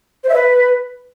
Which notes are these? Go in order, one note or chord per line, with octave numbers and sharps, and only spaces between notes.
C5
E5
B4